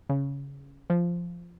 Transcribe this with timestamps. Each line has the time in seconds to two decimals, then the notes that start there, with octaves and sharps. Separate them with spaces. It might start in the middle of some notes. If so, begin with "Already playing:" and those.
0.09 C#3
0.90 F3